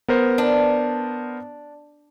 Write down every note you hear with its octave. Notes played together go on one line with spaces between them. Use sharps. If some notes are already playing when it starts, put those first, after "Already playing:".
B3 A#4 C5
D4